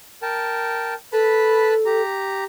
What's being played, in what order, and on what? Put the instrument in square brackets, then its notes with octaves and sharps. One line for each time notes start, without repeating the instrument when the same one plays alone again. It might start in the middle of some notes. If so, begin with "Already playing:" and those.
[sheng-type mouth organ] A#4 G5 A5
[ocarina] A4 [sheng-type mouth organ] B4 A5 B5
[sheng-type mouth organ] G4 A#5